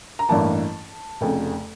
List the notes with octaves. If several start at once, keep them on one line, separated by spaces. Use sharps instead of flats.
A#5
A1 G2 E3 A#3 A5
F1 F2 C#3